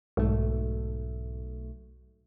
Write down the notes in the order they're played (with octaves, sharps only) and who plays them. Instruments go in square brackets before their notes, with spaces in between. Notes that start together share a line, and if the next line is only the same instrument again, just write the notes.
[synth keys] B1 A3 [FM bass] G#2